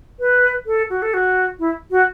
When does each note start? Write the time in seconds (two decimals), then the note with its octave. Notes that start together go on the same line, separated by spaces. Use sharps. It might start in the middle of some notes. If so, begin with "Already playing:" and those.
0.20 B4
0.66 A4
0.90 F#4
1.02 A4
1.14 F#4
1.59 E4
1.91 F#4